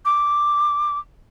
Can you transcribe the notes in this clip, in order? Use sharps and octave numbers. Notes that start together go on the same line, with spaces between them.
D6